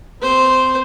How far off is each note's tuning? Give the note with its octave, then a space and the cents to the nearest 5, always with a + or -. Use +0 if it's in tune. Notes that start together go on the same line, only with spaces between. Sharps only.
C4 -20 C5 +0